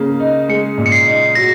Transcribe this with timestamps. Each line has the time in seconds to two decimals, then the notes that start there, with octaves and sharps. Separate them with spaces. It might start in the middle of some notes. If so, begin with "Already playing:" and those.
Already playing: C#3 A#3
0.20 D#4
0.49 G#3 C#7
0.78 A#2
0.86 C#7
0.92 C7
1.06 D#4
1.35 F#3 A#6